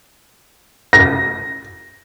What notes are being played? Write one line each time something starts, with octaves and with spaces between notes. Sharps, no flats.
A#6